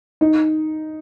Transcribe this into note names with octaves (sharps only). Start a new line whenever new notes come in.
D#4